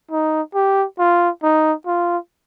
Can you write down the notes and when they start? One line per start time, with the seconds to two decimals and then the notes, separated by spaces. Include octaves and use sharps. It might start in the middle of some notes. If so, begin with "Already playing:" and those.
0.11 D#4
0.54 G4
0.99 F4
1.43 D#4
1.86 F4